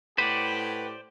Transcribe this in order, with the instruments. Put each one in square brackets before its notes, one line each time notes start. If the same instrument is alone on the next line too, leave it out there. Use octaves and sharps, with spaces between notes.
[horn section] A2 G4 [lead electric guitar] B4 F#5 [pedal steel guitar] C5 D5